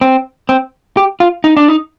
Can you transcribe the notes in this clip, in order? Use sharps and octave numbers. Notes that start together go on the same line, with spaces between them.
C4
C4
G4
F4
D#4
D4
D#4